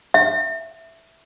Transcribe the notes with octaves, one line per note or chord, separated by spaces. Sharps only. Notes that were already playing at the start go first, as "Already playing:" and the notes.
E5